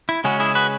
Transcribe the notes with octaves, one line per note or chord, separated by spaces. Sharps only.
E4
C#3 G#3 C#4 F#4
E4 G#4
F#4 B4